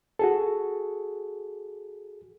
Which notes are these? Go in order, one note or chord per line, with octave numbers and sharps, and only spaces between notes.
F#4 G#4 A4